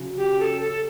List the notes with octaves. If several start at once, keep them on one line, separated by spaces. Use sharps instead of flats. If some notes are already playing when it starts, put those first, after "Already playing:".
Already playing: C#3 F#3 C#4
G4
A4
A4